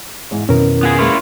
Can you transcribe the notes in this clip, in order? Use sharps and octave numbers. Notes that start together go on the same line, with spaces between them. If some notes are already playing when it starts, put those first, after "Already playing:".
E2 G#2
F2 B2 D#3 E3 C#4 A#4
B3 F4 G#4
G#3 A#3 B3 E4 F4 C#5